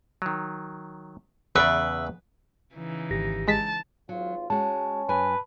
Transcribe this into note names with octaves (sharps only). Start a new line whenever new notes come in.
D#3 F#3
E2 C#3 B4 D5 E5
C#3 E3 D#4
G#1 G4 A#6
G#3 A5 B6
G#1 F#3 F4
G#3 C#4 F#4 A5
F#2 B4 G#5